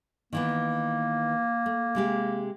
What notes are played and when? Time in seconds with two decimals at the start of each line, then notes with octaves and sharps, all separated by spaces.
0.33 D#3 E3 A#3 B3
1.66 A3
1.95 C3 G#3 G4